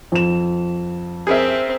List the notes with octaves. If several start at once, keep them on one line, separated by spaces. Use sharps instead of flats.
F2 E7
C4 G#4 A#4 E5